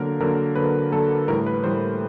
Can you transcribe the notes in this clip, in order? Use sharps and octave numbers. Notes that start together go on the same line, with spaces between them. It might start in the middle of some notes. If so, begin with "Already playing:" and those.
Already playing: D3 F#3 A#3 A#4
D3 F#3 A#3 A#4
D3 F#3 A#3 B4
D3 F#3 A#3 A4
A2 E3 G3 A#4
B4
A2 E3 G3 C5